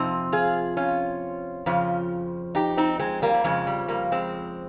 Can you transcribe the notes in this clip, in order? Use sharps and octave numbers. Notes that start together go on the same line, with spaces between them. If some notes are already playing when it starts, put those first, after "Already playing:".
Already playing: F2 C3 F3 C4 D#4
F4 G#4
C#4 F4
F2 C#3 F3
D#4 G4
C4 D#4
G#3 C4
G3 A#3
G3
F2 C#3 F3 G#3
G3
G3 A#3
G#3 C4